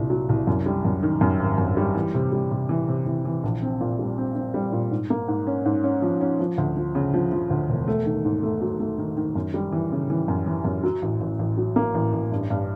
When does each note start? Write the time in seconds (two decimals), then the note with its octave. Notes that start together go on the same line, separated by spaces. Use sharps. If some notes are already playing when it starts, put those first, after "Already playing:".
Already playing: C2 A#2
0.10 F#3
0.29 C2
0.47 F#2
0.66 G3
0.85 F#2
1.03 D#3
1.21 F#2
1.40 G#1
1.58 F#2
1.77 G3
1.95 E3
2.14 C3
2.32 G3
2.51 C3
2.69 E3
2.88 C3
3.06 E3
3.25 E3
3.43 A#1
3.62 C4
3.80 A#2
3.99 G3
4.18 C4
4.35 C4
4.54 G3
4.72 A#2
4.91 G#2
5.10 A#3
5.28 G#2
5.47 C#4
5.65 G#2
5.84 C#4
6.02 F3
6.21 C#4
6.39 F3
6.58 D2
6.76 F3
6.95 C#3
7.14 F3
7.32 F3
7.50 D2
7.69 E1
7.88 A3
8.06 D#3
8.25 G#2
8.43 A3
8.61 F#3
8.80 A3
8.98 D#3
9.17 D#3
9.36 F#2
9.54 G3
9.72 E3
9.91 C#3
10.10 E3
10.28 F#2
10.46 E3
10.65 F#2
10.83 F#3
11.02 A1
11.21 A1
11.39 A1
11.57 F#3
11.76 A#3
11.94 A1
12.13 A1
12.32 G2
12.50 G2